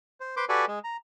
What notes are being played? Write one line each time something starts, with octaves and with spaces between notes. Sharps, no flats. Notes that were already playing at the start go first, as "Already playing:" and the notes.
C5
B4 C5 C6 D6
F#4 G4 A4 B4 D5 G#5
G#3
A#5